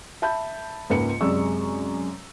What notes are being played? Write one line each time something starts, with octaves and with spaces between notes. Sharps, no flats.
E5 A5 B5 G6
C#2 G#2 A#3 B4 C#7
F#2 C3 G#3 D5 C#6 E6